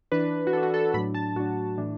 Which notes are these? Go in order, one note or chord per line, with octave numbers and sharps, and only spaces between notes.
E3 D4 B4
F#4
E3 D4 A4
F#4
A4
A2 F#3 D4 B5
A5
A2 F#3 D4 F#4
A2 E3 D4